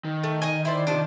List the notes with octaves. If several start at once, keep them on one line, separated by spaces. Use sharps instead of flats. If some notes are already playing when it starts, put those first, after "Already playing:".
D#3
A3
D#5 G#5
E4 C5 D5
C3 F3 D4